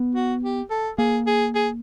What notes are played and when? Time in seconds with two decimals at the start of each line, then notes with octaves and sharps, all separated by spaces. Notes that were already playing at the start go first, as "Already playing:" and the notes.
Already playing: B3
0.15 F#4
0.43 G4
0.70 A4
0.98 A#3 G#4
1.27 G#4
1.55 G#4